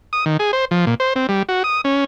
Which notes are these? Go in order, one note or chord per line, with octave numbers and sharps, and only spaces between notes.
D#6
D#3
G#4
C5
F3
A#2
C5
C4
G3
F#4
D#6
C#4